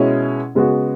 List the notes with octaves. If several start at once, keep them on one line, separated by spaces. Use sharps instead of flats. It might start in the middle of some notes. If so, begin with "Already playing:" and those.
Already playing: B2 G#3 C#4 E4
C#3 G#3 B3 F#4